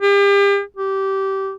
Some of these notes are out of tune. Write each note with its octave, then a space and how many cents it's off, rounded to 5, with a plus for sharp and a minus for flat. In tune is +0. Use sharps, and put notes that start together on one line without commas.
G4 +40
G4 -20